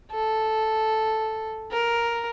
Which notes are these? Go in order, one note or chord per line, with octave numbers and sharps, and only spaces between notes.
A4
A#4